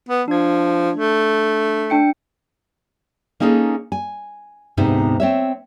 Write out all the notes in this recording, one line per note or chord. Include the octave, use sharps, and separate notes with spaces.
B3
F3 D4 G#6
A3
D4 G5 C#7
A#3 C#4 D#4 G#4 A4
G#5
D2 G#2 C3 B3 D#4
C4 C#5 E5